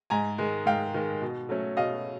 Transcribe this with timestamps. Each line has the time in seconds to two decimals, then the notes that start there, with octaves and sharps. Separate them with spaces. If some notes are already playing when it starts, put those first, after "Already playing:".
0.10 G#2 G#5 A#5
0.38 D#3 G#3
0.66 G#2 F5 G5
0.94 D#3 G#3
1.21 B2
1.49 F#3 A3 C#4
1.77 B2 D#5 F5